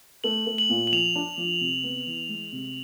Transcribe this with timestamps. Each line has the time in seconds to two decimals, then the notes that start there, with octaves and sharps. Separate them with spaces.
0.24 A3 F#7
0.47 A3
0.58 F#7
0.69 A#2
0.87 F#7
0.92 F3 F7
1.16 D4
1.38 F3
1.61 C3
1.83 B3
2.07 E3
2.29 G#3
2.52 C3